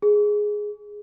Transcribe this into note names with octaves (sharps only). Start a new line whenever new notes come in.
G#4